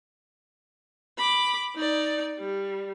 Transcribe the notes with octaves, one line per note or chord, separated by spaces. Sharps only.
B5 D6
D#4 D5
G3